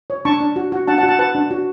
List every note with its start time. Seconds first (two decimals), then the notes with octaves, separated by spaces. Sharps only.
0.10 C#5
0.25 D4 A5 C#6
0.40 D4
0.56 F#4
0.72 F#4
0.87 D4 F#5 A5
0.98 F#5 A5
1.03 F#4
1.09 F#5 A5
1.19 B4 F#5 A5
1.35 D4
1.51 F#4